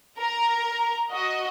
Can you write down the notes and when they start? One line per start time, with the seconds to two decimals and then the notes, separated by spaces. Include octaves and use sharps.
0.18 A#4 A#5
1.12 F#4 D#5